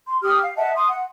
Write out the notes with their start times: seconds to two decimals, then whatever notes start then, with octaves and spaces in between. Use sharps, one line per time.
0.07 C6
0.22 G4 D#6 F6
0.43 F5
0.56 D#5 E5 F#5 A5
0.74 C6 D#6
0.87 F#5